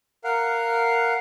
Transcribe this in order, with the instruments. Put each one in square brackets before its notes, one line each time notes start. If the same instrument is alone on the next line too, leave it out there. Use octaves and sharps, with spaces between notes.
[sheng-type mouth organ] A#4 F5 F#5